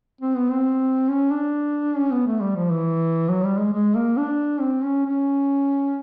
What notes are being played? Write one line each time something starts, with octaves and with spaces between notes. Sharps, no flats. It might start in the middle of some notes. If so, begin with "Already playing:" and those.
C4
B3
C4
C#4
D4
C#4
B3
A3
G3
F3
E3
F#3
G3
G#3
G#3
A#3
D4
C4
C#4
C#4